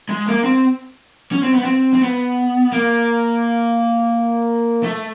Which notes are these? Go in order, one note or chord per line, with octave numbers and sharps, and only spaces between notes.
G#3
A#3
C4
C#4
C4
B3
C4
C4
B3
A#3
A3